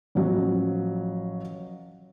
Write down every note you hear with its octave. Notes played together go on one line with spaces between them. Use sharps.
A1 F3 F#3